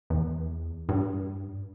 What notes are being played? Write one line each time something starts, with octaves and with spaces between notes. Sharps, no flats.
E2
G2